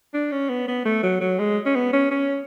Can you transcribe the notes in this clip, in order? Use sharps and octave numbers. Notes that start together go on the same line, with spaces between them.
D4
C#4
B3
B3
A3
F#3
F#3
G#3
C#4
B3
C#4
C#4